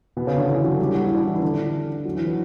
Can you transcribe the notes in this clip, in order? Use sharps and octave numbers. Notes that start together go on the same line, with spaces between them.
B2 B3
C#3 C#4
D3 D4
E3 E4
F#3 F#4
A4
G3 G4
F#4
E4
D4
E3 E4
E4
D3 D4
F#3
E3
F#3